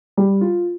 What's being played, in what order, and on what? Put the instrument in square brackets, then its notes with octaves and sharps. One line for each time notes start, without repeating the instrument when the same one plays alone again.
[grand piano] G3
F4